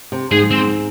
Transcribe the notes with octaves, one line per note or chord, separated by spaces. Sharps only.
C3
G#2 G#4
C4